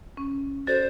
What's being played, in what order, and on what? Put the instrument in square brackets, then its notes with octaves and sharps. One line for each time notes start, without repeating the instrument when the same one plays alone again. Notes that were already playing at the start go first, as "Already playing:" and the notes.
[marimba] C#4
[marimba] F#4 A4 D5 [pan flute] C5 [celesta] A6